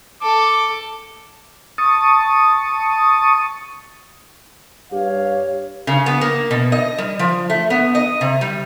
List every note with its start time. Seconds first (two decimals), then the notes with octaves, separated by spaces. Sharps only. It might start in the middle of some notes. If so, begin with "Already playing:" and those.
0.22 A4 D6
1.78 A5 C#6 D#6
4.92 G2 G4 C#5 F5
5.87 C#3
6.06 B3
6.21 A#3
6.51 B2
6.72 D#5
6.98 G3
7.19 F3
7.50 A3
7.70 B3
7.95 D#5
8.21 C3
8.41 G3